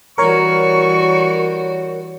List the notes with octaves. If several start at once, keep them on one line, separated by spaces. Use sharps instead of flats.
E3 G3 F#4 A#4 C#5 C#6